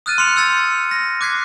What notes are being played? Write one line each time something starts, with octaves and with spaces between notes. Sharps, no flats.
D#6 F6 F#6 A6 D#7
C6 F6 C#7 F7
E6 G6 A6 F7
A#6
D6 F#6 G#6 B6 C7